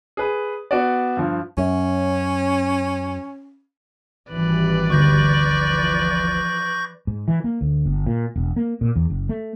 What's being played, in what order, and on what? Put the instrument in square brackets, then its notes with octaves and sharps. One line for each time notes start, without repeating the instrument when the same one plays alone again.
[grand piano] G#4 B4
B3 F#4 D5
G2 F3
[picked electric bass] F#2 [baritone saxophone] C#4
[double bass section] G#1 E3 G3 [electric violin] B4 D5
[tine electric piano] G1 D2 [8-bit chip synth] C#6 G6 A#6
[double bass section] E3 F3
[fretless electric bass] G#2
E3
A#3
D2
G1
A#2
E1
A#3
A#2
E2
F#1
A3